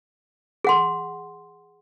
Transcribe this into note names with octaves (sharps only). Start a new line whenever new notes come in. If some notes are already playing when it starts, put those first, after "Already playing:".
G#4 F#5 C6